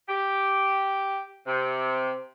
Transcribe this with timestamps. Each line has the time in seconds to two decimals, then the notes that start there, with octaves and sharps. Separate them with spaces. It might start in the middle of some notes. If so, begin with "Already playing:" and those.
0.09 G4
1.47 C3